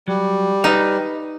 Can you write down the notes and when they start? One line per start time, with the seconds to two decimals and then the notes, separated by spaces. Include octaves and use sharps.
0.08 F#3 G3
0.64 D#4 B4 D#5 F5